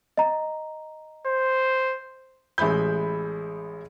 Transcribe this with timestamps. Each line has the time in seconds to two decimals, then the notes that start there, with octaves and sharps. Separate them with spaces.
0.17 D#5 A#5
1.27 C5
2.58 A1 G#3 E5 B5 G6